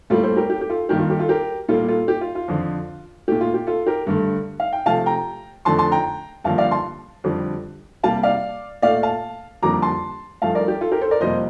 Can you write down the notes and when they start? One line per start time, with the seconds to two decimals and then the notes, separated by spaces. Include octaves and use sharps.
0.10 A2 G3 A#3 F4 A4
0.23 A4 C5
0.36 G4 A#4
0.50 G4
0.61 G4
0.70 F4 A4
0.89 G2 D#3 A#3 G4
0.99 F4
1.10 G4
1.19 F4 A4
1.29 G4 A#4
1.69 A#2 G3 A#3 F4 A4
1.88 F4 A4
2.08 G4
2.21 F4
2.35 F4
2.48 F2 D3 F3
3.28 A#2 A3 G4
3.41 F4
3.54 G4
3.67 F4 A4
3.86 G4 A#4
4.07 G2 D3 A3
4.60 F5
4.73 G5
4.86 C3 F3 A3 F5 A5
5.06 G5 A#5
5.65 F2 D3 A3 A5 C6
5.78 A5 C6
5.92 G5 A#5
6.44 G2 D3 F3 A#3 F5 A5
6.58 D5 F5
6.71 A5 C6
7.24 F2 D3 G3
8.03 C3 G3 A#3 F5 A5
8.23 D5 F5
8.82 A#2 A3 D5 F5
9.03 F5 A5
9.63 F2 D3 G3 A#3 A#5 D6
9.82 A5 C6
10.42 G2 F3 A3 F5 A5
10.55 A#4 D5
10.68 G4
10.81 F4 A4
10.92 G4 A#4
11.01 A4 C5
11.11 A#4 D5
11.21 F2 C3 G3 A#3 C5 D#5